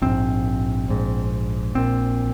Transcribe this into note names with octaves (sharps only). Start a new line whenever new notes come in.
A#1 G#2 C4
A#1 G#2
A#1 A#2 C4